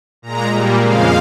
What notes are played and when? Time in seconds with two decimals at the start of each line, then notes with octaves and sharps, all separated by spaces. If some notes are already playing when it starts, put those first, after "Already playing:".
0.22 A#2 G#3 A#5
0.52 A#2 G3 A#3
0.81 F2 C#3 F3 G#3 F5